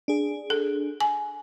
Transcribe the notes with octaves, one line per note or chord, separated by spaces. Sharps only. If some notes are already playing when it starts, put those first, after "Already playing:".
D4 G#4
A4
G#5